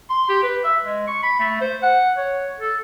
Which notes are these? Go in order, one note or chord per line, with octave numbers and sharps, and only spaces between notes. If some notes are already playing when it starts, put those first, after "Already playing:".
C6
G4
B4
E5
G#3
C#6
B5
A3
C5
F#5
C#5
A4